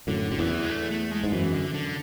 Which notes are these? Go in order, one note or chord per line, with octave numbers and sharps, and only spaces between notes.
F#2 A2 D3
F#2 D3
E2 E3
G#3
A3
A3
G#3
G#2
F#2 E3
D3
D3